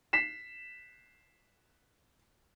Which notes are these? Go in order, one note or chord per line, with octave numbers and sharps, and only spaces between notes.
B6 C7 E7